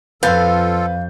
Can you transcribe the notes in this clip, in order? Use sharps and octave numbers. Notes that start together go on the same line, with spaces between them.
F2 F4 A4 B4 F5 G6 A6